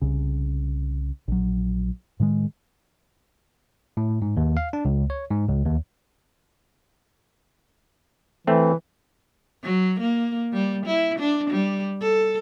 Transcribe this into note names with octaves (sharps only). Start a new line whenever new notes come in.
C2 C#3
A#1 F#3
A2 D#3 F#3 G#3
A2
G#2
D#2
F5
D4
C#2
C#5
G#2
C#2
D#2
E3 A3 C4
F#3
A#3
G3
E4
D4
G3
A4